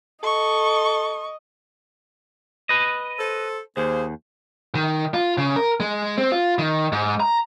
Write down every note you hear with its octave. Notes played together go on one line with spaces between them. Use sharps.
A4 D#5 C#6
B4 D#5
A4 C5
D#2 A#3 G#4 C5
D#3
F4
C#3
A#4
G#3
C4
F4
D#3
G#2
A#5